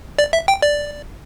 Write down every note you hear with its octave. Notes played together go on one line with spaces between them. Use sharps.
D5
E5
G5
D5